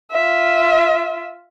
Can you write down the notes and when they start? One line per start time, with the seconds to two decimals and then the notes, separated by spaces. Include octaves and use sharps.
0.12 F4 E5